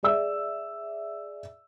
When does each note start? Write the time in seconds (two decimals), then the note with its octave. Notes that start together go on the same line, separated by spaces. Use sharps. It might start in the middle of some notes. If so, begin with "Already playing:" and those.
0.03 G#4 D5 E5 E6